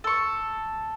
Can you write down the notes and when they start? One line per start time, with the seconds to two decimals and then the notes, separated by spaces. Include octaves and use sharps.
0.04 A4 C#6